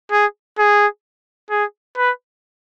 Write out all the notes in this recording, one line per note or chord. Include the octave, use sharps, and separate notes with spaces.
G#4
G#4
G#4
B4